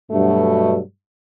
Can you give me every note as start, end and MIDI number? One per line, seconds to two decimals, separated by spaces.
0.12 0.78 43
0.12 0.78 47
0.12 0.78 54
0.12 0.78 57